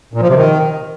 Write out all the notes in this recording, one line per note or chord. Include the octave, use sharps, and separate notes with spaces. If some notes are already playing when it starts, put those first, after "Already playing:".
A#2
F3
C3
D#3